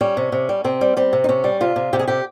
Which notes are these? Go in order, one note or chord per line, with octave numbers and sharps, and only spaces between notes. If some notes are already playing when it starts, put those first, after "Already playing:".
G3 C#4
C3
C3
G3
C3 C4
G3
G3 C4
C3
D#4
C3 C#4
G3
C3 F4
C3
C3 G4
G#4
C3 G4